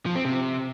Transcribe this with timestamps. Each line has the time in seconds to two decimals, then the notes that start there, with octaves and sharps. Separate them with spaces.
0.06 F3
0.16 C4
0.25 C3